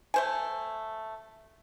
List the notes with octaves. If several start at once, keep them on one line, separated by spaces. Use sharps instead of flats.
A3 C5 G#5